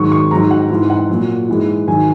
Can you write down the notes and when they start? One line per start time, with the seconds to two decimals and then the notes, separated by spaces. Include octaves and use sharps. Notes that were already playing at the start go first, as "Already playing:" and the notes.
Already playing: G#2 D#3 F#3 C#6
0.12 C#6
0.31 G#2 F#3 A#5
0.51 F#5
0.70 G#2 E3 G#3
0.90 F#5
1.09 A#2 F#3
1.48 G#2 E3 G#3
1.88 G#2 D#3 F#3 G#5